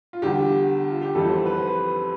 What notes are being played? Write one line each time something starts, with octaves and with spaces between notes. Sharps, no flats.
F4
E2 D3 G3 G4
F4
G4
F2 E3 G3 A4
C5
B4
C5
B4